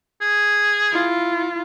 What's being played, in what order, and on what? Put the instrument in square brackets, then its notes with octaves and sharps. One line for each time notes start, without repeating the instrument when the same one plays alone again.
[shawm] G#4
[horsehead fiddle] E4 F4